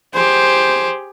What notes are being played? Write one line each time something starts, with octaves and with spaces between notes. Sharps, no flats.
G4 G#4 C5